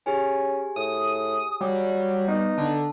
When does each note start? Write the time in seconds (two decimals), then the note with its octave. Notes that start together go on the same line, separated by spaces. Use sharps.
0.06 C#4 G4 G#4 G#5
0.76 A2 D#6
1.61 F#3 G3
2.28 B3 D#4
2.58 D3 A5